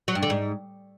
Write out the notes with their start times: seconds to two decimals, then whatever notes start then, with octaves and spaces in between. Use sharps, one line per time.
0.08 F#3
0.15 G2
0.23 D3
0.30 G#2